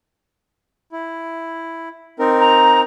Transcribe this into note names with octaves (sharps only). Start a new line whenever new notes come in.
E4
C4 D#4 A#4
A#5